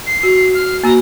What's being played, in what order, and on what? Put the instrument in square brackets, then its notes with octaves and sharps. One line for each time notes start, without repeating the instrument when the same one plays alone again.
[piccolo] C7
[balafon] F#4
[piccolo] F6
[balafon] A#3 F#4 [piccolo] A#5